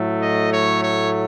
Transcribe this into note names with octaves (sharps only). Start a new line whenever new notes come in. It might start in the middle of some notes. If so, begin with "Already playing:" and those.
Already playing: A2 F#3 A3
D#5
C#5
C#5